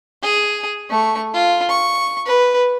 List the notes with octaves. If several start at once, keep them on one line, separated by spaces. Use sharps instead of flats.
G#4
A3 C#6
F4
C#6
B4